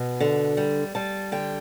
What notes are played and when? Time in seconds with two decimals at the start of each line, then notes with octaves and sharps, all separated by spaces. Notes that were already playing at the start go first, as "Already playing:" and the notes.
Already playing: B2
0.20 D3
0.57 G3
0.95 G3 A5
1.32 D3 G5